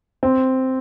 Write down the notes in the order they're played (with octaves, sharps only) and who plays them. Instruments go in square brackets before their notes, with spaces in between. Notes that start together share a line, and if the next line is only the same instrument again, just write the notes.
[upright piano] C4